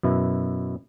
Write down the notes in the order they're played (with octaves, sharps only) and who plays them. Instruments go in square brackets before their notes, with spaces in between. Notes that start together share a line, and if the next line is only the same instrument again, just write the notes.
[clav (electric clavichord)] F#2 B2 E4